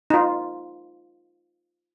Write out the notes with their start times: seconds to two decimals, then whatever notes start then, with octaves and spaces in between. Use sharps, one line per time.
0.10 D#4 F4